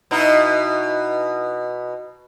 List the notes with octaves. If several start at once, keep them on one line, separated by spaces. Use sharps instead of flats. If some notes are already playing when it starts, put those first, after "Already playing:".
B2 D#4 E4